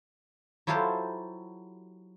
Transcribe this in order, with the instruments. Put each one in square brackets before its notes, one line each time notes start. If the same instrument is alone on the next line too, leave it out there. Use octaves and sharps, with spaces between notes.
[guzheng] F#3 E4 F4 G4 A4 C5